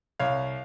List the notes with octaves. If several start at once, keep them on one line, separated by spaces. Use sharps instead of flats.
C2 C#5 F5